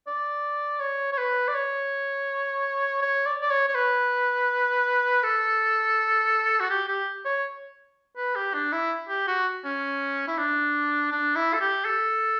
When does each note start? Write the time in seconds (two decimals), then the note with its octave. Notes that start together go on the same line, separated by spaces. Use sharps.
0.07 D5
0.80 C#5
1.12 C#5
1.18 B4
1.48 D5
1.55 C#5
3.02 C#5
3.26 D5
3.42 D5
3.51 C#5
3.68 C#5
3.75 B4
5.23 A4
6.60 F#4
6.70 G4
6.88 G4
7.25 C#5
8.17 B4
8.36 G4
8.54 D4
8.72 E4
9.09 G4
9.28 F#4
9.65 C#4
10.28 E4
10.38 D4
11.12 D4
11.36 E4
11.53 A4
11.61 G4
11.85 A4